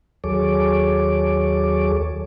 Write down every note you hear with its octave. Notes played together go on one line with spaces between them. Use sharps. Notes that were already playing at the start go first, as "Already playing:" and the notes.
D#2 F#3 G#4 A4 C#5 D6